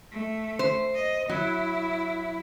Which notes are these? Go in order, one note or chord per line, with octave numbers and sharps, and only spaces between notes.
A3
C5
D#5
F#3 E4